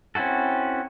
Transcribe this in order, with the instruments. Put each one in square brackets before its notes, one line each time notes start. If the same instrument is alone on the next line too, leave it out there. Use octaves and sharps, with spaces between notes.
[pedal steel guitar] C4 C#4 E4 F#4 A4